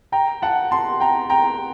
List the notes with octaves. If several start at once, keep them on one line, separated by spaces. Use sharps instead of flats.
G5 A#5
F#5 A5
A5 C6
G5 A#5
G5 A#5